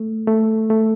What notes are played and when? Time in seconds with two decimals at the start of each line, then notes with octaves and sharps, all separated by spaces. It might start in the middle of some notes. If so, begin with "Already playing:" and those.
Already playing: A3
0.27 A3
0.70 A3